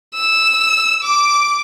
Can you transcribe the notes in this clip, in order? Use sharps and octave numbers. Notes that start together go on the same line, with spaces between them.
E6
D6